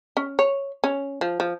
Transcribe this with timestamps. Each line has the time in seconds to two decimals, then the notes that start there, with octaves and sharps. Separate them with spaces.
0.17 C#4
0.39 C#5
0.84 C#4
1.21 F3
1.40 F3